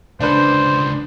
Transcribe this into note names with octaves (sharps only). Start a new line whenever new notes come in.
C#2 D3 D4 B4 C5